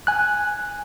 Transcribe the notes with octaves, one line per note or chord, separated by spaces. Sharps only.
G#5 F#6